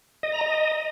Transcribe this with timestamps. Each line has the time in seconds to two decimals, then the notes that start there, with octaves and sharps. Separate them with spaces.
0.23 D#5
0.32 A#5
0.41 D#5